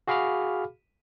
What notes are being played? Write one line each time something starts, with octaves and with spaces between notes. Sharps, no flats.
F#4 G#4 F5 B5 D6 F6